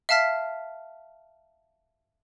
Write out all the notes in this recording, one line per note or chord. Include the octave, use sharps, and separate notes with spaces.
E5 F5 A5 F6 B6